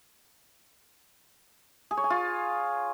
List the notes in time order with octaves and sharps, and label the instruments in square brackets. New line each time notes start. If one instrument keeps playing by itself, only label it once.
[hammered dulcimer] G#4
C#5
G#5
F4